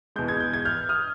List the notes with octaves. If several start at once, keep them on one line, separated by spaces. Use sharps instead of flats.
E2 B2 G#3 G6
G#6
G6
G#6
F6 G6
D#6 F6